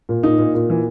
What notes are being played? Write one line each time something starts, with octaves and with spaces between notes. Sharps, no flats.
A#2
A#2 D#4
A#2
A#2
E3